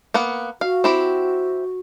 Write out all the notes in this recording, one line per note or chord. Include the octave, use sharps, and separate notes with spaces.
A#3 B3 F#5
F#4 F5
C4 E4 G4